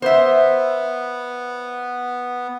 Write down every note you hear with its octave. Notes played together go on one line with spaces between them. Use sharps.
B3 C5 E5